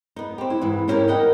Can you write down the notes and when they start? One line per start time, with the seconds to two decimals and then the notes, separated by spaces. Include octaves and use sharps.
0.16 B3 D#4
0.38 C4 G4
0.50 E4
0.62 G#2 E3
0.88 B3 C#4 E4 G4 A#4
1.08 A#4 D#5 F#5 G5